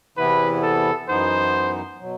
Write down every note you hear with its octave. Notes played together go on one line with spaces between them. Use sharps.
E2 C3 E3 B3 E4 B4
A4
F#2 E3 B3 D#4 C5
B2 F#3